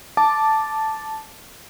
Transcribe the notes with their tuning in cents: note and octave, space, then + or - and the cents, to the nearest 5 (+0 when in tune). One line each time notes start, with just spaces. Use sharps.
A5 -5 D6 +0